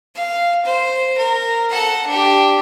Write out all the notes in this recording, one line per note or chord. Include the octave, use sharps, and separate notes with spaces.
F5
C5
A#4
A4 F#5
D4 G4